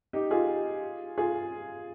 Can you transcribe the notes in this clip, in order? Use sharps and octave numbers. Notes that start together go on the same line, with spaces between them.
D#4 G4
F4 G#4
F4 G#4